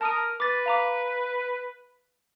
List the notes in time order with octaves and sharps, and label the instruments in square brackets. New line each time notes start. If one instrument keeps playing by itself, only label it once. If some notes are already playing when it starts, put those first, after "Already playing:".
[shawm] A#4 [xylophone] A5 D#6 D#7
[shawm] B4 [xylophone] D6 A6
[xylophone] F5 A#5 D6